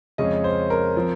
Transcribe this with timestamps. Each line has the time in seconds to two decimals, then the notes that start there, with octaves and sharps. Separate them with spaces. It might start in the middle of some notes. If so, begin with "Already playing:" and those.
0.18 F2 C#3 G#3 C#4 D#5
0.44 C5
0.70 A#4
0.97 F3 C4